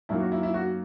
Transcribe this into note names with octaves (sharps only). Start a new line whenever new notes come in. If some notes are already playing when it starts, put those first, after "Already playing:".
F#2 D#3 A#3 E4
F#4
E4
E4
F#4